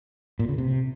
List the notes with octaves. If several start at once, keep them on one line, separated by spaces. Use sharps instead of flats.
A#2
C#3
C3